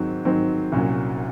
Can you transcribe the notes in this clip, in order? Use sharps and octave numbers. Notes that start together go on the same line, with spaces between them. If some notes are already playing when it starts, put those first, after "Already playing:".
Already playing: G#2 D#3 F#3 C4
G#2 D#3 F#3 C4
C2 A#2 F#3 C#4